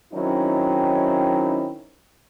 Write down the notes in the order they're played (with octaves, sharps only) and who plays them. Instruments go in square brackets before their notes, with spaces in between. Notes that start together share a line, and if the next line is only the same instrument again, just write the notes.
[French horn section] D#3 F#3 C4 C#4 D#4 E4